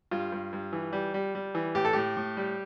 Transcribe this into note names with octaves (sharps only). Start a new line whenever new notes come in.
G2 F4
G2
G2
E3
G3
G3
G3
E3
A2 G4
A4
A2 G4
A2
G3